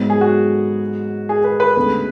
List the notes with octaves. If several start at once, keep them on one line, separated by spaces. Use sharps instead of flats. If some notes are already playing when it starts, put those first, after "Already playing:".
Already playing: G#2 F#3 B3
G#4
F#4
G#4
B4
B4
D2 C#3 G#3 B3